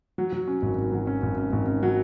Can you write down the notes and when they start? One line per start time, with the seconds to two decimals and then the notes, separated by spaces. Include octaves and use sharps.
0.18 F#3
0.33 F#3
0.47 C#4
0.62 G#1
0.78 G#1
0.92 F#3
1.07 C#4
1.22 G#1
1.37 C#4
1.52 G#1
1.68 C#4
1.82 F#3